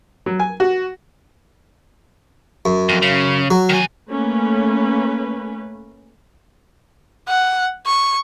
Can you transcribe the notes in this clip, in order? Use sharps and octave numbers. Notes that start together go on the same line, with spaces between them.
F#3
G#5
F#4
F#2
F2
C#3
F#3
D#3 G#5
A3 A#3 C#4 B4
F#5
C#6